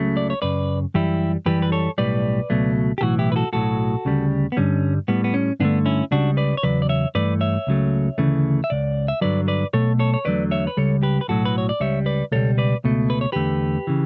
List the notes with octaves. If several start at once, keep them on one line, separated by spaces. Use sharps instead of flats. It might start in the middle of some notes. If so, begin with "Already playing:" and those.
Already playing: C#2 C#3 F#3 A3
D5
C#5
F#2 C#3 B4 D5
F#2 E3 G3 E4 G4
F#2 E3 G3 G4 B4
B4
A4 C#5
B1 A2 G3 B4 D5
C#2 B2 F#3 A3
G4
B1 A2 E3 F#4 A4
E4 G4
B4
F#4 A4
B1 A2 F#3 F#4 A4
D2 C#3 G3
B3
G2 D3 G3 C#4
A2 G3 B3
B3
C#4
G2 D3 A3 B3 D4
C#4 E4
C#2 C#3 G3 D4 F#4
B4 D5
C#5
E2 C#3 F#3 B4 D5
D5
C#5 E5
G2 E3 A3 B4 D5
C#5 E5
C#2 C#3 F#3 A3
D2 C#3 E3 A3
E5
C#2 C#3 D5
E5
G2 D3 F#3 B4 D5
B4 D5
B1 B2 A3 A4 C#5
A4 C#5
C#5
E2 D3 F#3 A3 B4 D5
C#5 E5
B4
C#2 C#3 G3 A4 C#5
G4 B4
B4
B1 A2 F#3 F#4 A4
B4
C#5
D5
C#2 C#3 G3 C#5 E5
B4 D5
C#2 B2 G3 A4 C#5
B4 D5
C#2 B2 A3
B4
C#5
E2 D3 A3 G4 B4
C#3 E3